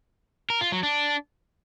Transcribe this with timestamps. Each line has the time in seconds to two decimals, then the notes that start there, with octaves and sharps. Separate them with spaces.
0.50 A#4
0.61 F4
0.72 F#3
0.83 D4